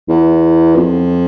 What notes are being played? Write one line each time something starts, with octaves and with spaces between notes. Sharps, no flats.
E2
F2